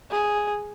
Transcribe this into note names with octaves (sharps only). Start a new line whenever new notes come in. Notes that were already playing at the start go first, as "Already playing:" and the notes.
G#4